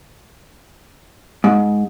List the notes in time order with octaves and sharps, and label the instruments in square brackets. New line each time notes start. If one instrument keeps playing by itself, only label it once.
[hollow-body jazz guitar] G#2